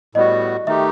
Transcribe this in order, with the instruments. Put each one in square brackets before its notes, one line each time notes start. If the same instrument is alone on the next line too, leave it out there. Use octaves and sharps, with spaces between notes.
[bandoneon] A2 G3 B3 F#4 [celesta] D#5
[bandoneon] D#3 A3 D#4 G4 [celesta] E5